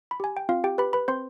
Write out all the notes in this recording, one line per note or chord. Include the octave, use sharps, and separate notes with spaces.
B5
G4 G#5
G5
C4 F4 F5
G4 G5
G4 B4 B5
B4 B5
C4 C5 C6